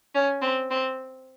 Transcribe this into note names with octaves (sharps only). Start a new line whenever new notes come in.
C#4
C4
C4